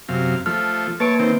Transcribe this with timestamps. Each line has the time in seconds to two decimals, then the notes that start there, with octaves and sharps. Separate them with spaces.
0.09 F#2 C3 F5
0.46 F3 A3 F6
1.00 A#3 B4 C#5 A5 D7
1.19 D#3 C4